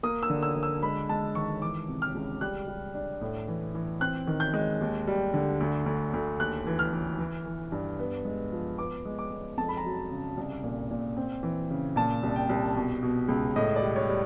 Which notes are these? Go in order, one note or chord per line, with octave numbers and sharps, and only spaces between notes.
A#3 D#6
E6
D3
E6
D3
E6
G#3 B5
G#3 A5
D#3 C#6
E3 D6
C3
F6
C#2
G3 F#6
G3
D4
A2
E3
E3
C4 F#6
D#3
G6
G#3
D#2
G3
D3
D2
D2
D2
D#2 F#6
E3
F6
E3
E3
E3
G2
B3
G#3
F3
B3 D6
G#3
D6
G#3
F2 A5
B5
A#5
F#3
C#3
C2
A#2
A#2
C4
E3
C#3
A#2 A5
C2
G5
C2
B2
B2
C#2
A2 D#5
D5
G3
C#5
G3